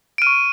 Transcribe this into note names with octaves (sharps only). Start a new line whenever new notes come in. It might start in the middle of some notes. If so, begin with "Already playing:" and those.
D7
C#6 F6 D#7